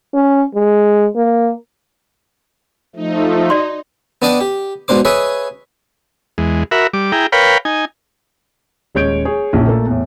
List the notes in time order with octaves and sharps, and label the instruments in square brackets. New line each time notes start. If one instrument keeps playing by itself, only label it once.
[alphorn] C#4
G#3
A#3
[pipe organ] F3 A3 [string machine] D#4
[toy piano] F#4 D5 C6
[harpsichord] B3 D4 D5 D#5 G5 A5
G4
G#2 B2 D4 C5 D6
G#4 B4 C#5 D#5 E5
[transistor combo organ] E2 G#3
F#4 A#4 E5 B5
G3 D6
E4 G#4 G5 A#5
A#4 B4 C#5 F5 G5 B5
D#4 G#5
[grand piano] D#1 G#3 C#4 C#5 G6 D7
G#4 C#5
A#1 A#2 C#4 E4
A#2 A3 A#3 A4
E2 A2